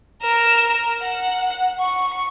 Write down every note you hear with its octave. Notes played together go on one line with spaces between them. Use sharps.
A#4 E7
F#5
C#6